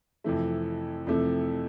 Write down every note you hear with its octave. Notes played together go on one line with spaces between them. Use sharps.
F2 C3 E3 A3
F2 C3 E3 A3